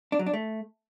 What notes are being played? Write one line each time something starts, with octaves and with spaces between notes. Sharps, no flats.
D4
F#3
D4
A3